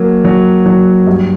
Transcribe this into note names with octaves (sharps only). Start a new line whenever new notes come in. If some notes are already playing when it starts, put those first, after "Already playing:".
Already playing: F#3 A#3
F#3
F#3
G2